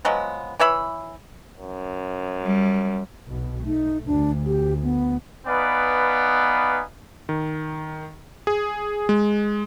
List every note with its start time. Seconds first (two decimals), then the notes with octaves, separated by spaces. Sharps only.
0.05 F3 F#3 G#3 B3
0.60 E3 C#5 E5 B5
1.57 F#2
2.41 G3
3.29 B1 B2
3.66 A3 D#4
4.06 D2 D4
4.45 G4
4.83 B3
5.47 B3 D#4 B4 D5 F5 G#5
7.29 D#3
8.47 G#4
9.09 G#3